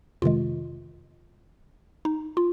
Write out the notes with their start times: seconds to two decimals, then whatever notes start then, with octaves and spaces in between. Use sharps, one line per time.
0.22 F2 C3 D#3 G#3 F4
2.05 D#4
2.37 F4